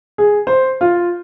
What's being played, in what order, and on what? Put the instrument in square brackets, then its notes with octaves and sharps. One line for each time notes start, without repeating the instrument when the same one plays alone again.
[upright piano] G#4
C5
F4